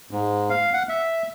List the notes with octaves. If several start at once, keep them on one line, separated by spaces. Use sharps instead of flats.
G#2
F5
F#5
E5